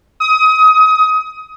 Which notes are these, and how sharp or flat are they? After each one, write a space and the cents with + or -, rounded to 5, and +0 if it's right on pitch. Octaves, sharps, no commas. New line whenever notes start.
D#6 +25